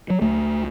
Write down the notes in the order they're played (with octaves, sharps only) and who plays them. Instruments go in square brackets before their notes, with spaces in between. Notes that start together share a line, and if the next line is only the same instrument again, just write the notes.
[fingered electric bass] F#3
C#2 A3